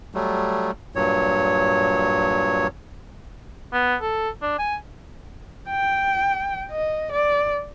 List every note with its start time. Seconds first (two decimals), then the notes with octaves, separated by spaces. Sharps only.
0.14 F#3 G3 A3
0.95 G2 A#2 F#3 C#5
3.73 B3
4.02 A4
4.42 D4
4.59 G#5
5.69 G5
6.71 D#5
7.12 D5